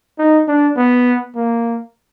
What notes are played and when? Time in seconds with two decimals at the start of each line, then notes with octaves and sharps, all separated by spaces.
0.19 D#4
0.48 D4
0.77 B3
1.36 A#3